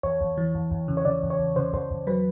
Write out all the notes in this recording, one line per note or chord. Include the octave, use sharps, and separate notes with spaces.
E2 C#5
E2
E3
E2
E2
C#3
C#5
C#3 D5
E2
C#5
E2
C#3 C5
E2 C5
E2
F#3 B4